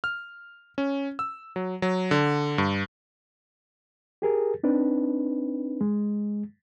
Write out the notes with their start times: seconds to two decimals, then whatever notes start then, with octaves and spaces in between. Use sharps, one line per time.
0.04 F6
0.78 C#4
1.19 E6
1.56 F#3
1.82 F#3
2.11 D3
2.58 G2
4.22 G4 G#4 A#4
4.64 C4 D4 D#4 B4
5.81 G#3